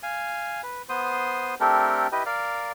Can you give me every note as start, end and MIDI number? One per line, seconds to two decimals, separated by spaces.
0.03 0.61 77
0.03 0.61 80
0.63 0.82 71
0.89 1.55 59
0.89 1.55 72
0.89 1.55 84
0.89 1.55 87
1.60 2.07 57
1.60 2.07 60
1.60 2.07 62
1.60 2.07 67
1.60 2.07 69
1.60 2.07 70
2.12 2.23 64
2.12 2.23 67
2.12 2.23 71
2.12 2.23 75
2.26 2.72 70
2.26 2.72 74
2.26 2.72 77